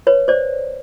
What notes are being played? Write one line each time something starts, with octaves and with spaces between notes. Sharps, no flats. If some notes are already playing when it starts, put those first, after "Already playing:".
B4 C#5
C5 D5